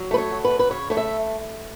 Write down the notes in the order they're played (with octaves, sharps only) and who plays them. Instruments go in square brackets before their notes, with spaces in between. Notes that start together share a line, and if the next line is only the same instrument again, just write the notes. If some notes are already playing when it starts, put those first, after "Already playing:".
Already playing: [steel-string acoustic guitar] F#3
A3 B4
C#5
F#3
B4
F#2
B4
C#3 C#5
A3 C#5
E5